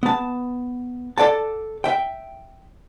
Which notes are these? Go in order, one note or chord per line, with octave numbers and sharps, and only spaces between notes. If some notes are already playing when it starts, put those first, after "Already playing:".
B3 A5
A4 D5 F#5 A5
E5 G5